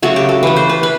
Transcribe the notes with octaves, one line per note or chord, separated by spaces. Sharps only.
C#3 F#3 A3 F#4
G4
A4
E3 A3 B4
C5
B4
B4